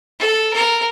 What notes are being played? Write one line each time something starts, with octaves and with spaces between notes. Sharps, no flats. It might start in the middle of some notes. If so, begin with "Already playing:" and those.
A4
A#4